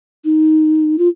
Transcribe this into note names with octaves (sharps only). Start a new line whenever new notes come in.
D#4
F4